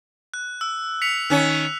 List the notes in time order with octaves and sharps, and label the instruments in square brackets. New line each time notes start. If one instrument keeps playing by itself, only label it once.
[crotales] F#6
E6
B6 C#7 F7
[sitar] D#3 C#4 [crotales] F#6